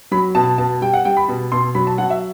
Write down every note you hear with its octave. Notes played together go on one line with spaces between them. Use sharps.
F#3 B5
B2 A5
B2 A5
G3 G5
F#5
G3 G5
B5
B2
B2 C6
F#3 B5
A5
F#3 F#5
E5